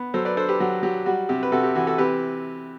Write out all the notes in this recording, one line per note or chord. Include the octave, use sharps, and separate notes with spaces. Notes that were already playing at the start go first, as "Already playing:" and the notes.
Already playing: B3
F#3 A4 C5
B4 D5
D4 A4 C5
G4 B4
F#3 F#4
F#3 G4
G3 F#4
C3 G4
B4
C3 F#4 A4
G4
E3 F#4
F#4 A4
C3 G4 B4